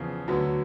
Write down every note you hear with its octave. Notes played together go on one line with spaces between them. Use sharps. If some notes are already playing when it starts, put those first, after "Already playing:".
Already playing: E2 C#3 F3
D2 D3 F#3 B3